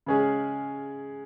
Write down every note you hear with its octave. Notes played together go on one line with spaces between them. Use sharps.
C#3 G#3 C#4 G#4